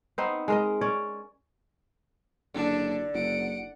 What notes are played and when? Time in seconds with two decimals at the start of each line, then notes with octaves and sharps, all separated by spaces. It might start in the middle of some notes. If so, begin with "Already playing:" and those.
0.18 B3 C4 D#4 C5
0.48 G#3 A#4 D#5
0.81 C#4 C#5 D5
2.54 F#1 D3 D4
3.14 F#1 F#5 D7